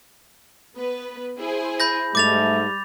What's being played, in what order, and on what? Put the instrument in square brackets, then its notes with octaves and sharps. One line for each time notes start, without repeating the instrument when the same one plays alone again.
[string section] B3 B4
E4 G#4 C5
[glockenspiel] B5 G6 A#6
[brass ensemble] G#2 A3 [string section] G3 [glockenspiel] D6 A6 F7